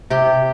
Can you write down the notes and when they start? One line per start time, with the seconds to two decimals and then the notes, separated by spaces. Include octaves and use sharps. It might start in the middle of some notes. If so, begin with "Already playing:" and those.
0.10 C3 G4